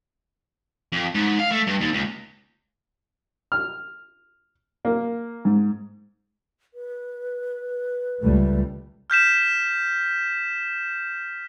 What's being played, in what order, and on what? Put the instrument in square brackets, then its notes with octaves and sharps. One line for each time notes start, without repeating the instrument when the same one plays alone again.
[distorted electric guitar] F2
G#2
F5
A3
G2
D#2
C#2
[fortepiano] F6
A#3
G#2
[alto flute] B4
[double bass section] C#2 G3 A3
[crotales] F6 G6 B6 E7